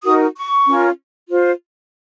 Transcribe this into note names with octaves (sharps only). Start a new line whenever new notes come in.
D#4 F#4 A#4 D#6
C#6
C#4 F4 A#4
F4 C5